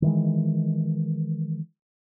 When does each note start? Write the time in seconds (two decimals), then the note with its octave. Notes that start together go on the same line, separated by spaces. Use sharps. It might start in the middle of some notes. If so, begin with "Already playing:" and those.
0.02 D#3 E3 G#3